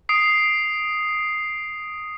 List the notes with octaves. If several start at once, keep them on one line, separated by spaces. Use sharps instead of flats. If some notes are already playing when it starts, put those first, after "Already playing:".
D#6 C7 D7